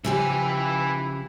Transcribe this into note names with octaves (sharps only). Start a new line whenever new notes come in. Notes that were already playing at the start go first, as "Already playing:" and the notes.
C#3 F3 E4 G4 G#5